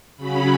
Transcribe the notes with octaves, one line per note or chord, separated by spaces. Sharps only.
C#3 F#3 C#4 B5